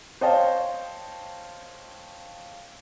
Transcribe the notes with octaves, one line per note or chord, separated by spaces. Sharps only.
C5 C#5 D#5 F5 G5 A5